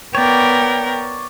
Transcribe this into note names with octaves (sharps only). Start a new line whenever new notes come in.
B3 A#4 C#5 D5 G5